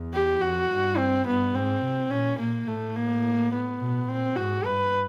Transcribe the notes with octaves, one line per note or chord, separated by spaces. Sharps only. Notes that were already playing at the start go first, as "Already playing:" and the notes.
Already playing: E2
G4
F2 F#4
G2
C4
G2 B3
G#2 C4
C3
A#2 C#4
A#2 A#3
A2 A3
A#3
B3
B2
A#2 C4
G#2 F#4
G2 B4